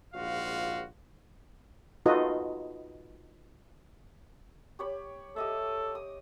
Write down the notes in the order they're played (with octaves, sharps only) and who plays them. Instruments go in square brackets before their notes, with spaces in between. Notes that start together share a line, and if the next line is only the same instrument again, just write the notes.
[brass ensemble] A#1 G#2 F4 F#4 F5
[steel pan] D#4 F4 F#4 A4 B4 D#5
[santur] G4 C#5 B5
[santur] G4 D#5 E5 [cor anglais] A4
[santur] D#6